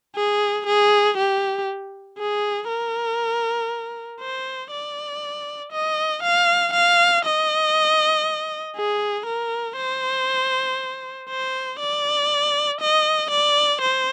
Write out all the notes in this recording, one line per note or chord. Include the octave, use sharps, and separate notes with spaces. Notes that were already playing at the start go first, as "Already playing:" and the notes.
G#4
G#4
G4
G#4
A#4
C5
D5
D#5
F5
F5
D#5
G#4
A#4
C5
C5
D5
D#5
D5
C5